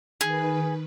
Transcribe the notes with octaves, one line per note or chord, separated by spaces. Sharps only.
D#3 G#4 B4